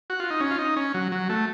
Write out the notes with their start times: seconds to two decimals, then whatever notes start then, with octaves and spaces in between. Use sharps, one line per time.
0.10 F#4
0.20 F4
0.30 D#4
0.40 C#4
0.51 F4
0.59 D#4
0.76 C#4
0.94 F#3
1.12 F#3
1.29 A3